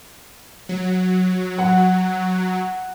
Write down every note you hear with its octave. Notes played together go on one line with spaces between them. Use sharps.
F#3
F#5